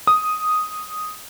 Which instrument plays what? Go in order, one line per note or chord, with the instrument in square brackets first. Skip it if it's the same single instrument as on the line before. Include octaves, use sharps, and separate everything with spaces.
[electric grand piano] D#6